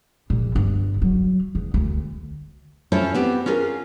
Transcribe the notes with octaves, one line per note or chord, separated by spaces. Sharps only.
A#1
G1
F#3
E2
D2
C#4 E4 F4 A4 C5 C#5
B3 C4 G4
C#4 F4 G#4 A#4